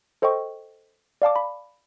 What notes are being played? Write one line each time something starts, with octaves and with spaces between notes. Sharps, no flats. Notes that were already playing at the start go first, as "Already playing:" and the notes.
A4 C5 D#5 G5 C#6
D5 F5 A5 D6
B5